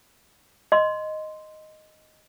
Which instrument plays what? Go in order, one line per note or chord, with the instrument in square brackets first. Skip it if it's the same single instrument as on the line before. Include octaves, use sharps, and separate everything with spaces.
[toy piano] D#5 C6